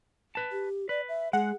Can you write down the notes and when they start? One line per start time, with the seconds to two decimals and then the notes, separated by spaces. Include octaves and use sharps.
0.35 B4 A5
0.52 G4
0.89 B4 D5
1.09 E5
1.33 G#3 G#4 F#5